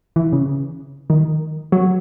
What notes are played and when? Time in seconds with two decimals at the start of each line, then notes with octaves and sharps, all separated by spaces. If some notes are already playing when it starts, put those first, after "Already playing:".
0.16 E3
0.33 C#3
1.10 D#3
1.72 F#3